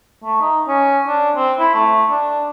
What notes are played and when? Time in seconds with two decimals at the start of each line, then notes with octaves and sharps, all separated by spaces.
0.24 A3
0.41 D#4
0.68 C#4
1.07 D4
1.36 C4
1.59 E4
1.74 A3
2.11 D4